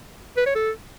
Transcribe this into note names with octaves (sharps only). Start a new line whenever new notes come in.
B4
C#5
A4